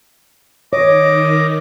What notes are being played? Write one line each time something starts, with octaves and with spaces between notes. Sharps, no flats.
D#3 C#5 D#5 D6